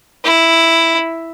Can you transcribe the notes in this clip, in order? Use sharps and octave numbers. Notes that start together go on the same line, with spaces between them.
E4